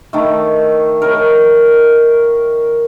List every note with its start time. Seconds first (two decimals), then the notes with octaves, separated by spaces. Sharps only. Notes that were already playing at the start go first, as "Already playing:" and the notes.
0.13 D#3 A3
1.02 A#4 C#5